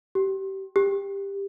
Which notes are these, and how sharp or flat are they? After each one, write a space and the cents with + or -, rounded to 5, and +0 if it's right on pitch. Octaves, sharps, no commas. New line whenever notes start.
G4 -25
G4 +15